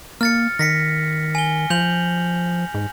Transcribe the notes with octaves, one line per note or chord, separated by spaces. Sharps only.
A#3 F6 A6 C#7
D#3 A#6 B6 C#7
G#5 G7
F3 G6 F7 F#7
G#2